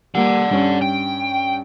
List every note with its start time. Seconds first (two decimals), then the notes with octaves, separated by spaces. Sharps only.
0.15 G3 A#3 D5 F#5
0.50 G2 C#4
0.81 G5